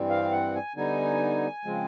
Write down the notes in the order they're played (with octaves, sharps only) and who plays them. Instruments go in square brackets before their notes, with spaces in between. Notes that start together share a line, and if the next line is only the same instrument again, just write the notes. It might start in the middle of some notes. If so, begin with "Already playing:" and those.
Already playing: [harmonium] G2 E3 G3 C4
F5
F#5
G#5
D3 G3 B3 D#4 G#5
C#3 F3 G#3 C4